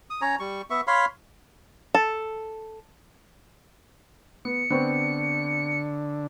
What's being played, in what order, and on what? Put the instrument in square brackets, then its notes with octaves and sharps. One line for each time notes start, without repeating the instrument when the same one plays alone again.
[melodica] D#6
C#4 C#5 A#5
G3 C#6
B3 E5 C#6
C#5 F5 B5 C6
[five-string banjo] A4
[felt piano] B3 [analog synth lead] C#7
[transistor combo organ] D3 D4 [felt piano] B3 C4 C#6